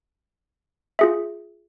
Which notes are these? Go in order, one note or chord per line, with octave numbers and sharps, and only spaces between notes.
F4 G#4 E5